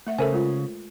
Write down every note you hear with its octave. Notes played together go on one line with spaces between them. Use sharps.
A3 E5 F#5
C#3 A4 A#4 C5 E5 G#5
G#3 F4